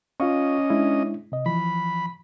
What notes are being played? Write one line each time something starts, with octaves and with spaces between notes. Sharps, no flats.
C#4 F4 D#5 F5 C#6
G#3 D4 E4
C3 D#5
E3 F3 B5